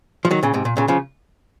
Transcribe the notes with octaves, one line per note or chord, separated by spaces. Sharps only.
F3
D#3 F#3
A#2 C#3
G#2 C3
A#2
A#2 C#3
C#3 F3